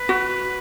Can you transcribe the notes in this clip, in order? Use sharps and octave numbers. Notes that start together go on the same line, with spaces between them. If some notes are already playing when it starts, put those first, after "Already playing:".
Already playing: B4
F#4